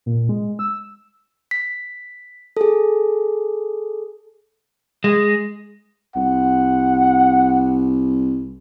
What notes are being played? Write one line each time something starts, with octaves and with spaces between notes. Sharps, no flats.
A#2
G#3
E6
B6
G#4 A4
G#3
C2 F#5